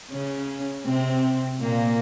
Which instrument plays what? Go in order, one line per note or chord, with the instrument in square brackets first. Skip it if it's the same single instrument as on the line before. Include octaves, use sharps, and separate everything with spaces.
[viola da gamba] C#3 C#4
C3 C4
A#2 A#3